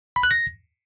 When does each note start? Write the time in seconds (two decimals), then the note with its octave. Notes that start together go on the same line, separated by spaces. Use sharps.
0.16 B5
0.23 F#6
0.31 A#6